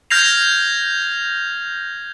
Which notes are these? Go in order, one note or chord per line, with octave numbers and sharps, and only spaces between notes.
F6 G6 G#6 A#6 C7 F7